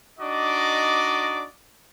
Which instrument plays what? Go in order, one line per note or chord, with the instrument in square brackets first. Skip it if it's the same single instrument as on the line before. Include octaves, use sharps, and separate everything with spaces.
[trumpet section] D4 D#4 F#4 D5 D#5 D6